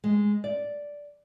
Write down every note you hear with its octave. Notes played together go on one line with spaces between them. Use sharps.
G#3
D5